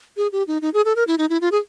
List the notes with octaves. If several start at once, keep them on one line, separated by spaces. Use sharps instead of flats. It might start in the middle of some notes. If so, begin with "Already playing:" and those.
G#4
G4
D#4
D#4
G#4
A4
A#4
E4
D#4
E4
F4
G#4